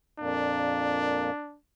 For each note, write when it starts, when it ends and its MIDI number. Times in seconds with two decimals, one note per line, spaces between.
0.20 1.31 41
0.20 1.31 46
0.20 1.31 58
0.20 1.58 62